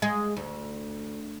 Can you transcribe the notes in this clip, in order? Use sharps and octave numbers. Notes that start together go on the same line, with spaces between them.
G#3
D2